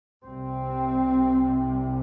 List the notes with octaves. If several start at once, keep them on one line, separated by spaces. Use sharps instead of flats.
C2 C3 C4